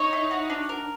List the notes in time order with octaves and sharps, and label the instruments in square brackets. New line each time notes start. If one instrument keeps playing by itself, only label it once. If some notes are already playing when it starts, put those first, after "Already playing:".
Already playing: [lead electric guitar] D#4 [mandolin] C#5
[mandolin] E4
F#4
D4
A#4